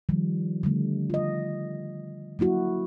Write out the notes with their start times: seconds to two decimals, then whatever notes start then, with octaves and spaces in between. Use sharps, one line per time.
0.09 D#3 F3 G3
0.63 D3 G3 A3
1.10 F4 D#5
2.39 F#3 A#3 E4 F#4